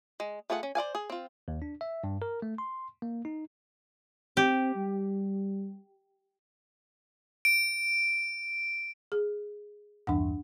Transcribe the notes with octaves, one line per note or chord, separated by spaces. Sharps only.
G#3
A3 F4 G#4 C#5 F#5
C#4
C5 D5 F5 G#5
G#4
C4 F4
D#2
D4
E5
G2
A#4
A3
C6
A#3
D#4
C4 G4
G3
D7
G#4
B1 E2 G2 D4 F#5